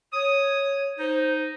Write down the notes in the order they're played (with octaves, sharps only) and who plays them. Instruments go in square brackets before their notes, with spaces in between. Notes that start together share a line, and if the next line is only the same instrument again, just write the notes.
[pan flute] C#5 [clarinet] D#6
[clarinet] D#4 [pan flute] C5